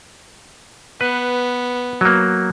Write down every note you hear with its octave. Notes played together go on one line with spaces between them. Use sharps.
B3 B4
F#3 A#3